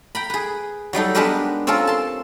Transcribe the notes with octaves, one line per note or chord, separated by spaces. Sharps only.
G5 A#5 B5
G#4 B4
F#3 G3 D#4 A4
G#3 B3 D4 G4 A#4 B4
C4 C#4 F4 A4 A#4
A5 C6